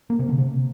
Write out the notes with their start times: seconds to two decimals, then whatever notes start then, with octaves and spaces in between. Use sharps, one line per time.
0.10 A#3
0.19 C3
0.29 D3
0.38 C3